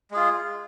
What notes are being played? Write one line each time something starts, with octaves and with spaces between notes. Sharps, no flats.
G#3 F4 G#4